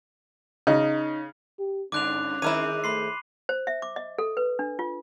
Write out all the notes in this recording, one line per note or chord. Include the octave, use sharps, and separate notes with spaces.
C#3 D#4
G4
G2 D3 C#4 D4 D6 F#6 F7
D#3 G#3 C4 E4 A#4 C#5 D6 D#7
A3 B5 C6 C7
C5
E5
D6
D#5
A4
B4
D4
F4